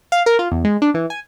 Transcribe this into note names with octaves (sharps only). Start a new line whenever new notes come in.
F5
A#4
F4
E2
G#3
D4
E3
G#5